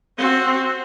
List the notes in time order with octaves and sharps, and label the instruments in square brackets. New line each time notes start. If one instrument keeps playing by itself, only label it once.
[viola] C4 F#4